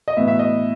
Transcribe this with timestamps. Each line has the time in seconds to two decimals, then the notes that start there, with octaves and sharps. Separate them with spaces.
0.08 D#5
0.17 A2 E3 B3 E5
0.28 E5
0.39 D#5